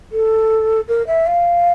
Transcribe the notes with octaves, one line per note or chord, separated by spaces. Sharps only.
A4
A#4
E5
F5